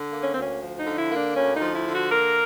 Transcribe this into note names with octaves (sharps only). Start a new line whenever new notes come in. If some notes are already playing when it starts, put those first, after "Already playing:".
Already playing: D3
A#3
C#4
D2 C4
C#4
F3
D#4
D3
E4
A#3
D4
D2 C#4
D#4
F3
E4
D3
F#4
A#3 A#4